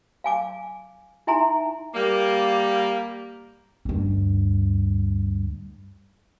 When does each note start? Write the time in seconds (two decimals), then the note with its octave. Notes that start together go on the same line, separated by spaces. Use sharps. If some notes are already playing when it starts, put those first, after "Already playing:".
0.24 F5 G#5 D6
1.27 D#4 E4 E5 G#5 A#5 C6
1.94 G3 A#3
3.85 D2 G2